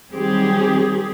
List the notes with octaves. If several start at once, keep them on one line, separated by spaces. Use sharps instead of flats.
D#3 F#3 G3 C4 G4 G#4